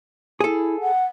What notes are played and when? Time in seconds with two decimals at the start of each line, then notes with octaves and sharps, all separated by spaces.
0.40 E4 G#4 A4
0.81 F#5